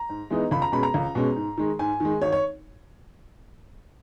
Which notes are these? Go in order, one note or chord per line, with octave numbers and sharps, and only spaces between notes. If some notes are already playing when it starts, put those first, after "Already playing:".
Already playing: A#5
G#2
E3 G#3 B3 D#4
C#2 B5
A#5
B2 G#3 C#4 B5
A#5
C#2
B2 G#3 C#4
G#2
D#3 G#3
G#2 G#5
D#3 G#3
G#1 C#5
C#5